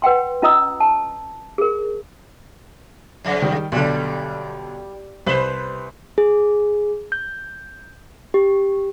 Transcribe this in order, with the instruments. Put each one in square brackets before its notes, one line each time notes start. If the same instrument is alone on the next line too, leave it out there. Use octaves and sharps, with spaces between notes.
[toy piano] B4 F#5 G5 C6
C#4 F4 D#5 A#5 D#6 E6
A5
G#4 A#4
[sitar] F2 C#3
[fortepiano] D#3 G3
[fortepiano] B1 D3 [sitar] G3
[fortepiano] C2 [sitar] B4 C5
[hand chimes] G#4
G6
G4